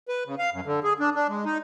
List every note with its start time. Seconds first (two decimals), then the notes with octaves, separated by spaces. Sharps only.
0.08 B4
0.26 C#3
0.39 F5
0.53 F#2
0.65 D3
0.84 G#4
1.00 D4
1.15 D4
1.28 G#3
1.45 D#4